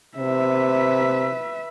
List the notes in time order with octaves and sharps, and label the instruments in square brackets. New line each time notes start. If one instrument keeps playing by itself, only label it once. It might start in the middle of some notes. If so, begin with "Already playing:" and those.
[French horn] C3 [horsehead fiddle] B4 E5